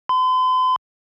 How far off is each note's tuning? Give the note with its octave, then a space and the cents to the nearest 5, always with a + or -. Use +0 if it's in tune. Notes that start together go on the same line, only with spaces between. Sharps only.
C6 -45